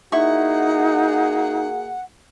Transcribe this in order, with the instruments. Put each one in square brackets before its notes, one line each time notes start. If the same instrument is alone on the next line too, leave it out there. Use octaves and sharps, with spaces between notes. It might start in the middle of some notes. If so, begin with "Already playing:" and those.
[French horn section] A#3 F#4 G#4 [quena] D#4 [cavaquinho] E4 C#6 [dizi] F#5